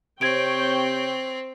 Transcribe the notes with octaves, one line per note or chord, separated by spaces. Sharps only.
C3 C4 C#5 G5 G#6 D7